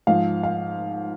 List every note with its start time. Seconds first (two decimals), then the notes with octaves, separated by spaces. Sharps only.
0.07 G#2 F3 F5
0.43 F5